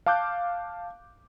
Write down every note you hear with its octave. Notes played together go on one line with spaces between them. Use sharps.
F5 A5 D6 F#6 G6